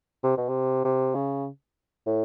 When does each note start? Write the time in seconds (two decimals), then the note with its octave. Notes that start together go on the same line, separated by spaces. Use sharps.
0.24 C3
0.37 B2
0.49 C3
0.85 C3
1.15 C#3
2.07 A2